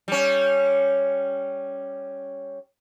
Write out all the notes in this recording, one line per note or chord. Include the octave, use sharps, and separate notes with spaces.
G3 C#4